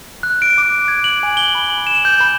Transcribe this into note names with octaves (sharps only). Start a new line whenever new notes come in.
F#6
D7
D6
G#6
F#7
G#5
G7
B5
F#7
E7
G6
B5